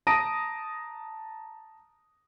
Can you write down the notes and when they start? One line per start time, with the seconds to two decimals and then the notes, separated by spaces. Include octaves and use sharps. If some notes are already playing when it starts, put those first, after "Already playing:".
0.07 A5 A#5 D#6 A#6 D7 D#7